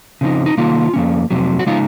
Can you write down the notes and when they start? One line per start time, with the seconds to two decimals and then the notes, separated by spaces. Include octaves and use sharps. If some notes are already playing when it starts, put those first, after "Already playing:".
0.21 C#3 F3 C4 D#4
0.46 D#4
0.57 C3 D#3 A#3 D#4 F4
0.94 F2 D#3 A#3 C#4
1.30 F2 C3 F#3
1.59 F#4
1.67 C#3 G#3 D#4 F4